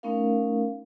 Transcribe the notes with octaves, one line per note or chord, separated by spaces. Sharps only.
A3 B3 C#4 D#4 A#4 F5